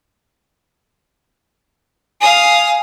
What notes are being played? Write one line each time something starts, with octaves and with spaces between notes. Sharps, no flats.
F5 G#5 D#6